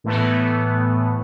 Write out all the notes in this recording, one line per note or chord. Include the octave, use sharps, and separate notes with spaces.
A2 E3 A3 B3